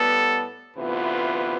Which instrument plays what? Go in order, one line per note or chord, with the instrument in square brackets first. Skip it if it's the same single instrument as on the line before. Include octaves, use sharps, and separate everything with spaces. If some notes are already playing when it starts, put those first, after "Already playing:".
Already playing: [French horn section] A2 G3 B3 [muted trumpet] A4
[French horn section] D2 C3 E3 B3 F4 [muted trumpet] B4